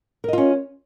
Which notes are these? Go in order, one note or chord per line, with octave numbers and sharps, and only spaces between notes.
C#4 F4 A#4 D#5